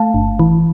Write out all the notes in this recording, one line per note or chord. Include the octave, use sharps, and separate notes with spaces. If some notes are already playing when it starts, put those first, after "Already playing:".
Already playing: A3 F5 A5
G1
E3